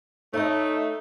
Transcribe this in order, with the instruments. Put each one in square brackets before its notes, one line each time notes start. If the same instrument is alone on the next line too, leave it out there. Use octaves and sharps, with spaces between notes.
[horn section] A3 D#4 [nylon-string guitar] C#5 D#5